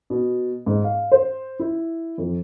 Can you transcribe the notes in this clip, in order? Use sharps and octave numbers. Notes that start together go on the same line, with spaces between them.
B2
G#2
F5
C5
E4
F2